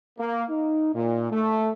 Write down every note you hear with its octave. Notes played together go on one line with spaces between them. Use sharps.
A#3
D#4
A#2
A3